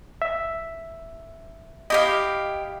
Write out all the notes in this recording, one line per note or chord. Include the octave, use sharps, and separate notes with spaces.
E5
E4 G4 D#5 F5